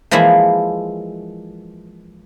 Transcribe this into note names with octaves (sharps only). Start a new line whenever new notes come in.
E3 F3 G#3 A#3 E4